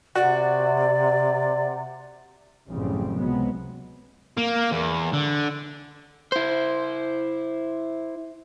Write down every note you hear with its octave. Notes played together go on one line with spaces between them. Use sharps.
C3 F#4 D5 F#5
A1 F#2 C#3 F3 G3 C4
C#2 C3 F#3 G#3 B3
A#3
E2
D3
E4 C5